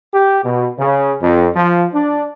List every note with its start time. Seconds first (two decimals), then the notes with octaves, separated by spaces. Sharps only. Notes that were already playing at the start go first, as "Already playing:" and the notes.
0.13 G4
0.44 B2
0.77 C#3
1.21 F2
1.56 F3
1.93 D4